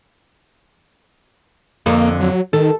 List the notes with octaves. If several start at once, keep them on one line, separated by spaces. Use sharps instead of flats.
F2 D3 A#3
F#3
D#3 A4